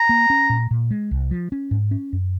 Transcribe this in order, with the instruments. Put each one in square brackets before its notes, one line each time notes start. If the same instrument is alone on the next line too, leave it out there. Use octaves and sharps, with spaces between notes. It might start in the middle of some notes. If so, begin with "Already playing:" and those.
Already playing: [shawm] A#5
[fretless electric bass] A#3
C#4
A#2
A#2
G#3
C2
F3
C#4
G#2
C#4
F#2